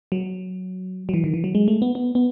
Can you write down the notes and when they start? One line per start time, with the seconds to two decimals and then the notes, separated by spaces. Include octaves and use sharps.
0.12 F#3
1.09 F#3
1.14 E3
1.24 D#3
1.34 E3
1.44 F#3
1.55 G#3
1.68 A3
1.82 B3
1.95 B3
2.15 B3